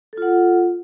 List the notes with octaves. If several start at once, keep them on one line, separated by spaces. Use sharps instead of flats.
F4 A4 F#5